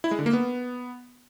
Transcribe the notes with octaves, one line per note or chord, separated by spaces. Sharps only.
E4
G#3
D3
A#3
B3